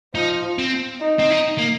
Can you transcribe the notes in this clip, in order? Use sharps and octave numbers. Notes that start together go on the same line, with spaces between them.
F3 D#4
C4
D#4
C4
D#4
A#3